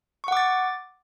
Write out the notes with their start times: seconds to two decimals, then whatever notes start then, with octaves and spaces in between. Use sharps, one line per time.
0.24 C#6
0.28 F#5
0.32 D6
0.37 A6